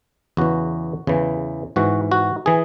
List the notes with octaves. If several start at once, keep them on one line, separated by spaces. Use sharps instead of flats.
E2 C#3 E3 F#4
E2 C#3 E3
G#2 E3 F#4
F#4
E3 G#4